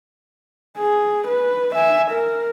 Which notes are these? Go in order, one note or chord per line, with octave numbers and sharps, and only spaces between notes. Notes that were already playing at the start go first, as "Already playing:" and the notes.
G#4
B4
E5 G#5
A#4